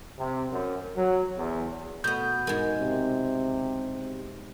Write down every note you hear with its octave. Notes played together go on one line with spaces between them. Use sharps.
C3
F#2
F#3
E2
B2 A3 B3 G6
G#2 G#3 A#4
C3